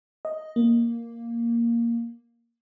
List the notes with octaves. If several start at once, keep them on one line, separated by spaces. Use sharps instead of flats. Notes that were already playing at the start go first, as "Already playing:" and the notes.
D#5
A#3